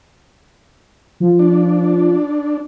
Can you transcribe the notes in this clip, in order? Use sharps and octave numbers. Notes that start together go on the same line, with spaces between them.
F3
D4